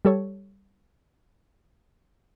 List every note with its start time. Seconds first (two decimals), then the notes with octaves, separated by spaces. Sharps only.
0.05 G3 A4 C#5